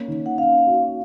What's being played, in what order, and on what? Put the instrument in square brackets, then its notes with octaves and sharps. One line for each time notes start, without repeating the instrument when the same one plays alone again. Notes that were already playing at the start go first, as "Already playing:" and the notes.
Already playing: [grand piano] A#3 C#4
D#3
[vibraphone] F#5
[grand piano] C#4 [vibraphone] F5
[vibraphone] F5
[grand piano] F#4